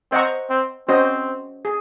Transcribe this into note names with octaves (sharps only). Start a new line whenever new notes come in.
C4 C5 D#5 F#5 A#5 C#6
C4
C4 C#4 F#4 C5 D#5
G#4